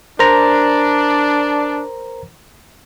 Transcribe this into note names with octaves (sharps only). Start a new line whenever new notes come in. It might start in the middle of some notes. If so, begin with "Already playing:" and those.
D4 A#4 C5 A#5